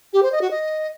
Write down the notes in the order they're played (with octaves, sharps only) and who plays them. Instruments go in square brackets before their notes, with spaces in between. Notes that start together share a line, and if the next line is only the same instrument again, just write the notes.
[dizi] G4
C5
D#5
F#4
D#5